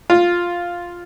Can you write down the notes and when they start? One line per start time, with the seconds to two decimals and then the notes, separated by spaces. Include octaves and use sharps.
0.10 F4